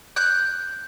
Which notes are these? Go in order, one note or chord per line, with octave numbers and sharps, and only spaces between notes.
F#6 G6